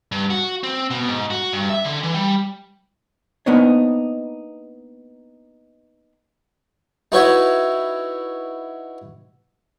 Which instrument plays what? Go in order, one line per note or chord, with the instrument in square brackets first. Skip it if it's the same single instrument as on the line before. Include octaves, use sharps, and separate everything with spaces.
[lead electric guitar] G2
F#4
C4
B2
G#2
F#4
G2
E5
D3
E3
G3
[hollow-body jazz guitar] A#3 B3 D4 D#4 C5 C#5
[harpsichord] D#4 E4 F#4 B4 C#5 E5